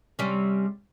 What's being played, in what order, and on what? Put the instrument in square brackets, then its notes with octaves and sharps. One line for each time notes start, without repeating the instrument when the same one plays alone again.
[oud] C3 G3 C#4